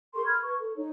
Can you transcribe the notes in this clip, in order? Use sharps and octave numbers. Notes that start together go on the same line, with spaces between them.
G#4 A#4 C6 C#6
B5 F6 G#6
B4 C#6
A4
D#4 C#5